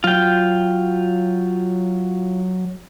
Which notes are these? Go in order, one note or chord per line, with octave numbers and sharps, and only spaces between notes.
F#3 F4 G5